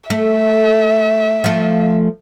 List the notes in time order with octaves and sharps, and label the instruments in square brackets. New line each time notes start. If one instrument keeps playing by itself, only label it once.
[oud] A3 [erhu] E5
[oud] F3 A3